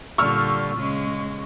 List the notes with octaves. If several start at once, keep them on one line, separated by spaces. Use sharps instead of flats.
A#2 D3 G3 C#6 E6 F6
C#3 G#3